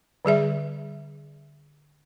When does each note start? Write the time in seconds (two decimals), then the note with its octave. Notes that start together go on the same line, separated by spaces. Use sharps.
0.25 D3 G3 G#4 E5